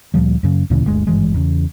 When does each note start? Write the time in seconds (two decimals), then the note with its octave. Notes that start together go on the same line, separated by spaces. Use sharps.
0.14 D2 A#2 F3 G3
0.43 F#2 C#3
0.70 D2 A#2 C#3 E3
0.86 G1 D2 G#3
1.07 G#1 G2 E3 G#3
1.34 E2 C#3